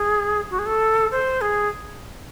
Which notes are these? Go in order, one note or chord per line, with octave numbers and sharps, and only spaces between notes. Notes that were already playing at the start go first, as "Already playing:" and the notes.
Already playing: G#4
F#4
G#4
A4
C5
G#4